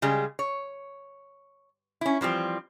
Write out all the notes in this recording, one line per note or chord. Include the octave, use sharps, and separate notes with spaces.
C#3 G3 G#3 G#4
C#5
C#4 E4
E3 F3 G3 C4